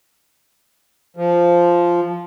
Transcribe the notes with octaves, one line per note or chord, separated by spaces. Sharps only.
F3